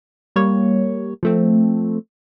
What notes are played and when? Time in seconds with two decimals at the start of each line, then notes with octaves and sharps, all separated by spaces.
0.36 G3 A#3 C#5
1.23 F3 A3 C4